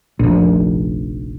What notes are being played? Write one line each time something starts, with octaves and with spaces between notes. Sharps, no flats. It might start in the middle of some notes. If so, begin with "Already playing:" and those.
F1 A#1